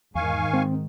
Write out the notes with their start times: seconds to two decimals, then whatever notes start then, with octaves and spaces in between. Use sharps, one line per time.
0.15 E2 G#2 D#3 F5 G#5 C#6
0.54 G#3 C4